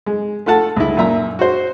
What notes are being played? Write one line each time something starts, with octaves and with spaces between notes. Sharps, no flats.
G#3
A3 F4 A4 F#5 A5
C#2 E4
F#2 A#2 E5 A#5
F#4 C5